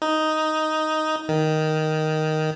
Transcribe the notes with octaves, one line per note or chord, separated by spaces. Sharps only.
D#4
D#3